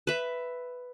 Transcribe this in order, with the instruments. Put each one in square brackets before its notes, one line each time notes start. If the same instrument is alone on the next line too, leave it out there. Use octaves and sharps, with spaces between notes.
[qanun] B4 E5